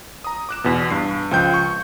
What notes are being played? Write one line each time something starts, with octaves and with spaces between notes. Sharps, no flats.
A#5 D#6
D6 F#6 E7
E2 B2
G2 C7
C#2 F3 G5 G6
C#6